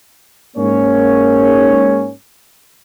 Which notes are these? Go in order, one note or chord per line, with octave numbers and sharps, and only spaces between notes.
G#2 A#3 C#4 C#5